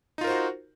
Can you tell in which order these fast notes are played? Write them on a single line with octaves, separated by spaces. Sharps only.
D#4 F4 A#4 C5 F#4